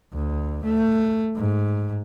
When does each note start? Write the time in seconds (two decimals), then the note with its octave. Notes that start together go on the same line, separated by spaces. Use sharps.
0.13 D2
0.64 A3
1.36 G#2